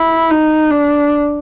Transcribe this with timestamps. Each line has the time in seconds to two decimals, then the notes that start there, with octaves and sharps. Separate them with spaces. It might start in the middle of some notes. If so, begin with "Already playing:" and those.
Already playing: E4
0.30 D#4
0.71 D4